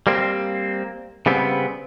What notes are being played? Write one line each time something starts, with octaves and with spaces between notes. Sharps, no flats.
G3 A#3 C4
C#3 G3 B3 C4